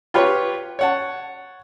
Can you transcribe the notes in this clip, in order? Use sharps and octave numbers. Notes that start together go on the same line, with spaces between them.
F4 G4 B4 C#5
C#5 F#5 A5